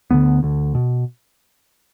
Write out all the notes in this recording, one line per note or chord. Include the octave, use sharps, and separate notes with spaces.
D2 D3 B3
D2 D3
B2